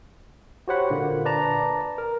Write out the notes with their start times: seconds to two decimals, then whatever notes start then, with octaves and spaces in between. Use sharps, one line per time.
0.68 F#4 G4 C5 C#5 F#5 B5
0.90 A#2 D3 A#3
1.25 B4 D5 A5 A#5
1.98 A#4